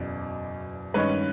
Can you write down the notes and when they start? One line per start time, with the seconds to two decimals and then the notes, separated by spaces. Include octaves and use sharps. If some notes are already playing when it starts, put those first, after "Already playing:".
Already playing: F#1 E2 B2 D5
0.94 G2 D#3 G#3 C#4 B4 C#5